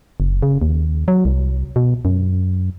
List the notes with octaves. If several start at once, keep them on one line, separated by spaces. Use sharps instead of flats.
F#1
C#3
D#2
F#3
C2
B2
F#2